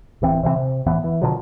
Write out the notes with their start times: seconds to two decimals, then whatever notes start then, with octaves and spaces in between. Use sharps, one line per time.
0.22 D1 E3 C4
0.43 C3 E3 F#3 C4
0.56 C3
0.86 F2 A2 E3 B3
1.04 E3
1.22 B2 D3 F3 F#3